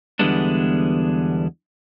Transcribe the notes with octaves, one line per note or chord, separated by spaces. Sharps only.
E2 D3 G3 G#3 B3 D4